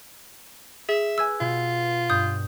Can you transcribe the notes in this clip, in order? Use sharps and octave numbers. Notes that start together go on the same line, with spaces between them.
G#4 E5
B4 G#5 E6 G#6
B2 F4
G2 D#6 G6